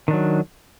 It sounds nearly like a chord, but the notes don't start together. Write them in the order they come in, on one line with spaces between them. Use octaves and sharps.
D#3 D4 F#3